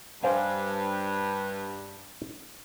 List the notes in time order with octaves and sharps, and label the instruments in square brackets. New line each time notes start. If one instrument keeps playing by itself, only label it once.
[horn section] G2 [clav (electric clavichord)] C5 F5 G#5